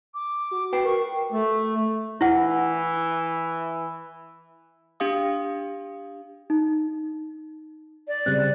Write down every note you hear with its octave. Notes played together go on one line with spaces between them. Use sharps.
D6
F#4
B4 G5 C7
A#4 C#6
A3
E3 E4 F#5
D4 G4 F5 D#6
D#4
D5
C#3 G3 C4 F#6